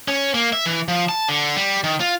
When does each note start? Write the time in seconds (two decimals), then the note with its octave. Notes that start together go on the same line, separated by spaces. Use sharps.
0.08 C#4
0.34 A#3
0.53 E5
0.66 E3
0.88 F3
1.09 A5
1.29 D3
1.56 G3
1.84 D#3
2.00 F4